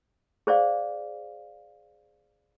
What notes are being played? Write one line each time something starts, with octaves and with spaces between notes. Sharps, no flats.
G#4 C5 D5 F5